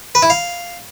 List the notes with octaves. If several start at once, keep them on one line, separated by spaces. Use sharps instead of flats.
B4
E4
F5